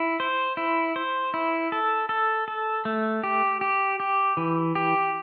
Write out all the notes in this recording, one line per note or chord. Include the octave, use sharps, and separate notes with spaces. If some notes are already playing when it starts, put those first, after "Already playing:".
Already playing: E4
C5
E4
C5
E4
A4
A4
A4
A3
G4
G4
G4
E3
G4